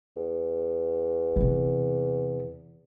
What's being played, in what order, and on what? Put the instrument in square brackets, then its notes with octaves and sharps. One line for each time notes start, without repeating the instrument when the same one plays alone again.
[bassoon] E2
[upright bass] C3 E3